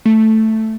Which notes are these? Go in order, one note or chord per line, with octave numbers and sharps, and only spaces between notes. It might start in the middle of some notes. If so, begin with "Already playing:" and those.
A3